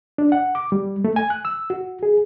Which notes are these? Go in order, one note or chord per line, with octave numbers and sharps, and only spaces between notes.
D4
F#5
D6
G3
A3
G#5
F#6
E6
F#4
G#4